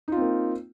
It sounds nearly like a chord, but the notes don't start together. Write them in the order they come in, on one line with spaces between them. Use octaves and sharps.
D#4 F4 C4 A#3